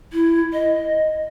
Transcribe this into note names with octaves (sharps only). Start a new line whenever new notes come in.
E4
D#5